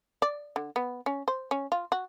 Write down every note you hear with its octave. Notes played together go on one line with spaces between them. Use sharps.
D5
D3
B3
C#4
C5
C#4
F4
F#4